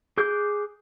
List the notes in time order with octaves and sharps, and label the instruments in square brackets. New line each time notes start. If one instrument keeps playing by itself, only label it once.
[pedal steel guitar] G#4 D6 F#6 G6